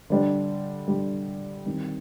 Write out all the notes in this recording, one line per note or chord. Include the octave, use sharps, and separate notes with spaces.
D3 G3 D4
D3 G3 D4
D#3 G3 C4